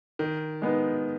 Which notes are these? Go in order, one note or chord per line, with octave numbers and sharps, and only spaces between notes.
D#3
G#3 B3 D#4